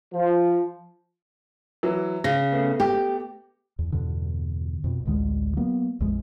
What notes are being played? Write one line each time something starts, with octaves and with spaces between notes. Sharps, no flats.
F3
E3 F#3
C#3 A#6
A3 B3
G4
E2
E2 G2 B2 D3
F2 B2
A1 D2 D3 G#3
F#3 A#3 B3
A#1 F2 F3 G#3